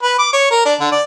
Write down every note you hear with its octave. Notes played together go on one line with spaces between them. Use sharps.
B4
D6
C#5
A#4
D4
D3
D5